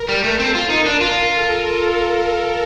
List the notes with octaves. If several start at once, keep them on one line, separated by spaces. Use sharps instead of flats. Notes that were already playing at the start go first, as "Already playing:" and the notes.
Already playing: A#4
G3
A3
C4 A4
F4
D#4 A#4
D4
F4 A#4
A4